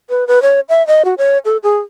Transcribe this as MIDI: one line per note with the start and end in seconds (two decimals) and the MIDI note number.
0.10 0.27 71
0.27 0.42 71
0.42 0.60 73
0.69 0.85 76
0.87 1.03 75
1.05 1.14 66
1.18 1.38 73
1.45 1.57 69
1.63 1.78 68